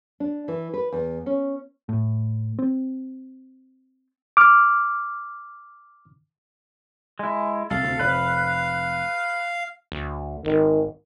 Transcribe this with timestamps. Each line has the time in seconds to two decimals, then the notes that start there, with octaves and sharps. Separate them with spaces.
0.20 D4
0.48 E3
0.74 B4
0.92 E2
1.26 C#4
1.89 A2
2.59 C4
4.37 D6 F6
7.19 G#3 E4
7.70 C2 A4 F5
7.83 D2 C3
8.00 F1 F2 B4
9.92 D2
10.45 G#1 D#3